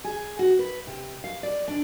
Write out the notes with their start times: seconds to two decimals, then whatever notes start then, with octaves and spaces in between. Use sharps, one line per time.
0.04 G#4
0.39 F#4
0.59 B4
0.87 C3
1.24 F5
1.43 D5
1.68 D4